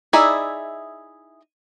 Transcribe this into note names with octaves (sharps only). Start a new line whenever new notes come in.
D#4 E4 G#4 D5 E5